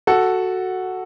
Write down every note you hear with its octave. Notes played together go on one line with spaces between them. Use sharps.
F#4 A4